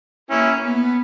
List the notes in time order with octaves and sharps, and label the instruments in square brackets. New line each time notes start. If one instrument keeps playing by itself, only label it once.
[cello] A#3 [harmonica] C#4 E4
[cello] B3